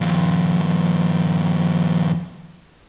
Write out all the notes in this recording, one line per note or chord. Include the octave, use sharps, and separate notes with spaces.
D#2 F3